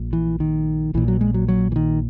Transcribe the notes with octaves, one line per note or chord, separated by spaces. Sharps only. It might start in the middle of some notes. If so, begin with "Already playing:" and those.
Already playing: A#1 A#2
E3
D#3
A#1 A#2 E3
F#3
G#3
F#3
F#3
E3
D#3